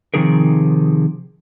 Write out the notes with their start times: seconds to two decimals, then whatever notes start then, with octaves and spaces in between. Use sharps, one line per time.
0.14 C3 D#3 F3 D#4 G#4 A#4